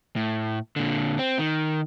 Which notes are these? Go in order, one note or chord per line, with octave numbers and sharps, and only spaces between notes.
A2
A#2 D3
C4
D#3